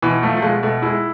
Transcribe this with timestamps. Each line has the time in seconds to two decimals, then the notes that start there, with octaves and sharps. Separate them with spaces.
0.02 B2 E3
0.23 F3 A3
0.37 F3
0.42 B2 G#3
0.63 B2 A3
0.82 G#3 E4